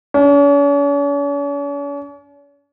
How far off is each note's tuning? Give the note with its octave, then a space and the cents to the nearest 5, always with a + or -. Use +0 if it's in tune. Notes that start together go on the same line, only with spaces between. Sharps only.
C#4 +45